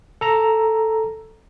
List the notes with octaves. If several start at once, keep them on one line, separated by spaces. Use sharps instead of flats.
A4 A#5